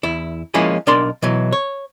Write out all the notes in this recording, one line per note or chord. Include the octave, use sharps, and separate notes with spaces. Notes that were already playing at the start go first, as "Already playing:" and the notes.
E2 E4
F3 G#3 A#3 C#4 E4 G#4
B1 D4 A#4 D5 C6
B2 E3 F#3
C#5